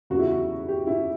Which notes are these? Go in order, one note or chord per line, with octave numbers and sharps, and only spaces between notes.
E2 C#3 G3 F#4
E4
F#4
G4
E4